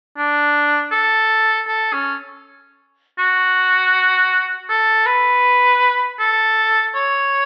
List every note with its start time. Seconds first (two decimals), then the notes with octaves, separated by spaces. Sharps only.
0.18 D4
0.92 A4
1.68 A4
1.93 C#4
3.19 F#4
4.70 A4
5.06 B4
6.19 A4
6.95 C#5